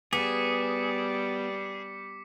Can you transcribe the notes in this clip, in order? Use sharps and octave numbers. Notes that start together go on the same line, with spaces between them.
G3 B3 G#4 D6 B6 C#7